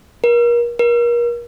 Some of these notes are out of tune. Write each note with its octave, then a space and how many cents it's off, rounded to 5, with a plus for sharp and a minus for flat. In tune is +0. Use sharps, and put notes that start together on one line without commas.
A#4 +35
A#4 +35